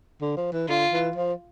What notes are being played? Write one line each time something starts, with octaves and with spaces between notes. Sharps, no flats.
D3
F3
E3
D3 F4
E3
F3